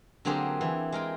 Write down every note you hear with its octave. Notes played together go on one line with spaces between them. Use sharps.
D3 F#3 A#3 C4 G4 G#4
E3
G#3 A#4 G5